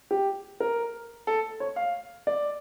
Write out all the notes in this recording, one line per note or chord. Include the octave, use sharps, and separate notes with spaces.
G4
A#4
A4
C#5
F5
D5